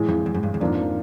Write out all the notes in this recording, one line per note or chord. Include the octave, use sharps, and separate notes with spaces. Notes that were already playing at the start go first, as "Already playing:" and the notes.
Already playing: A2 E3 G#3
F2
E2
F#2
G2
E2
F2 G#2 F3 A#3 D4